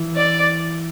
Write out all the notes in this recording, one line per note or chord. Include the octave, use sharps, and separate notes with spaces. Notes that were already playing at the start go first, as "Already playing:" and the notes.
Already playing: E3
D5